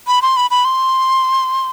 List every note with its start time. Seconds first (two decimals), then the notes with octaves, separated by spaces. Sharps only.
0.07 B5
0.22 C6
0.37 B5
0.51 B5
0.65 C6